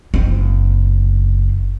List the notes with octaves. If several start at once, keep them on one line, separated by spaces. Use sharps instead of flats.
F#1 C4